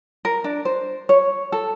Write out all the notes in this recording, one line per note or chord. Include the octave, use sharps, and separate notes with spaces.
A#4
D4
C5
C#5
A4